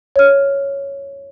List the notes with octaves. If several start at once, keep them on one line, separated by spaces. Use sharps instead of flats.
C#5 F6